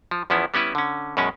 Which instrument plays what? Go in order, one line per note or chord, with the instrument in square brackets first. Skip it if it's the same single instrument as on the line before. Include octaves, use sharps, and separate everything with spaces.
[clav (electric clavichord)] F3
E2 F3 B3 C#4 E4
G3 B3 C#4 E4 B4
D3 C#4
F#2 B2 G#3 C#4